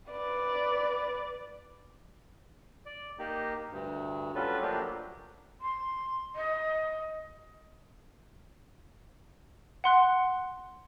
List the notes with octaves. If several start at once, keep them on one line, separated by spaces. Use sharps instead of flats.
B4 D5
D5
A#3 D#4 G4
D2 G2
F#3 G3 C#4 F4 A4 B4
F3 F#3 A3 A#3 D4 G4
C6
D#5
F#5 C6 F#6